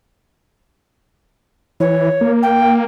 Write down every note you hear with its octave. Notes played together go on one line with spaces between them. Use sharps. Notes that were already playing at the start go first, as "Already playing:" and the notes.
E3 C#5
A#3
G5